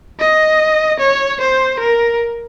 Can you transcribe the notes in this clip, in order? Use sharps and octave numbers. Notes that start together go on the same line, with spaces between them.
D#5
C#5
C5
A#4